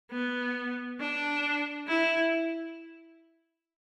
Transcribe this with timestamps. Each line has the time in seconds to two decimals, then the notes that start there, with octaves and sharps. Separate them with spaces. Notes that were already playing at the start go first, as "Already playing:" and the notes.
0.11 B3
1.00 D4
1.88 E4